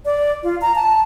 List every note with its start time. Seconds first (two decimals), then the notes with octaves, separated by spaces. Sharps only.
0.05 D5
0.43 F4
0.61 A#5
0.75 A5